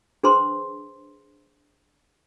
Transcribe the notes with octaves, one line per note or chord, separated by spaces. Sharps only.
D4 G#4 B4 C5 A#5 C6